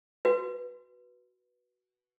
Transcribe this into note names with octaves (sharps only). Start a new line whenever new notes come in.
F#4 B4